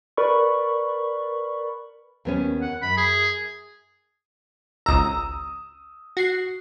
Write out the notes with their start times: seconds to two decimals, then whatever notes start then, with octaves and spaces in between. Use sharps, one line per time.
0.17 A#4 B4 D5 B5 C#6
2.25 D#2 B3 C#4
2.61 F#5
2.82 F#2 B5
2.97 G#4
4.86 G#1 C#2 A#5 D#6 E6
6.17 F#4 C7